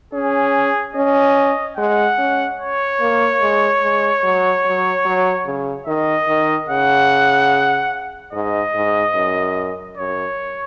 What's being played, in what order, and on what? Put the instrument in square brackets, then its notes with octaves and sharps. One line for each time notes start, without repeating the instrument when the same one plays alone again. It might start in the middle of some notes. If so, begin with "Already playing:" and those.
[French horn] C#4 [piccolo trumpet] G#4
[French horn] C#4 [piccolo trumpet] D#5
[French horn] G#3 [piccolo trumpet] F#5
[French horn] C#4
[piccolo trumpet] C#5
[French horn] A#3
G#3
G#3
F#3
F#3
F#3
C#3
[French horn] D#3 [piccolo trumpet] D#5
[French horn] D#3
[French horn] C#3 [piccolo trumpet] F#5
[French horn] G#2 [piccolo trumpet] D#5
[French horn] G#2
F#2
[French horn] F#2 [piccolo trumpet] C#5